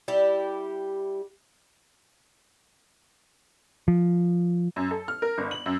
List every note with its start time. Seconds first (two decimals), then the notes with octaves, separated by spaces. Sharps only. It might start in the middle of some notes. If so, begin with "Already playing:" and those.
0.08 G3 E4 G4
3.88 F3
4.76 F#2
4.91 A4
5.08 F6
5.22 A#4
5.38 G1
5.51 F#7
5.66 F#2